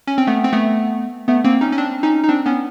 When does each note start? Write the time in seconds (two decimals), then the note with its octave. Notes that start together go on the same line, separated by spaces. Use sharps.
0.07 C#4
0.18 C4
0.27 A3 B3
0.44 C4
0.53 A3 B3
1.28 A3 B3
1.44 A#3 C4
1.61 C#4 D#4
1.72 C#4
1.78 C4 D4
2.03 C#4 D#4
2.24 D#4
2.29 C4 D4
2.46 B3 C#4